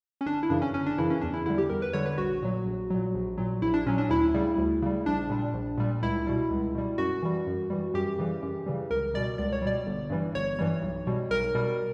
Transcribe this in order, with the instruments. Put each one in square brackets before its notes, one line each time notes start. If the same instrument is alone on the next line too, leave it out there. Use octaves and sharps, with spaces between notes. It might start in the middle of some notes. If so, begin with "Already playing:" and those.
[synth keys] C#4
G1 D4
E4
F#2 C#3 E3 D4
C#4
G1 C#4
D4
F#2 C#3 E3 E4
C#4
E2 D4
E4
D3 G3 E4
G4
E2 A#4
B4
D3 G3 C#5
B4
A#1 F#4
A#2 F#3
A#1
A#2 F#3
A#1
A#2 F#3
A#1 E4
D4
A#2 F#3 C#4
D4
D2 E4
C#3 G3
D2
C#3 G3
A#1 D4
A#2 G3
A#1
A#2 G3
C#2 E4
B2 G3
C#2
B2 G3
F#2 F#4
E3 G3
F#2
E3 G3
F#2 G4
C#3 E3 G3
F#2
C#3 E3 G3
C#2 A#4
B2 G3 D5
C#2 D5
C#5
B2 G3 D5
G1
G2 E3 G3
G1 C#5
G2 E3 G3
B1
B2 G3
B1 A#4
B2 G3